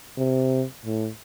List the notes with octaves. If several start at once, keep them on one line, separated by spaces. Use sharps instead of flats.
C3
A2